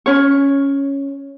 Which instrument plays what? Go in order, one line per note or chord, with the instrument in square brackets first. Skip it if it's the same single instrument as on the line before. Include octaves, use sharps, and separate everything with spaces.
[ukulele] C#4 C#5